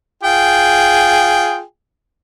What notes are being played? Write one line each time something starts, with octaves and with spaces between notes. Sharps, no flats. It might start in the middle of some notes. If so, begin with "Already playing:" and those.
F4 G#4 G5